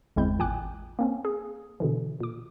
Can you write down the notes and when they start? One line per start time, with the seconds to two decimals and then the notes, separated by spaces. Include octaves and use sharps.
0.16 G1 E2 G#3 C4 E4 G6
0.39 A1 A#2 G5 G#5 D6 F#6
0.99 A#3 C4 C#4
1.25 G#4
1.80 B2 D3 E3
2.20 A#2 D6